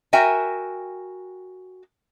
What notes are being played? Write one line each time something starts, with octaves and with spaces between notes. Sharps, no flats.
F#4 A#4 E5 G5 G#5